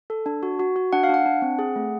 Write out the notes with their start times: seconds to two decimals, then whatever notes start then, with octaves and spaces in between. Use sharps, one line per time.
0.10 A4
0.26 D4
0.43 F#4
0.60 F#4
0.76 F#4
0.93 D4 F#5
1.04 F5
1.09 D4 F#5
1.26 D4
1.42 C4
1.59 G#4
1.76 A3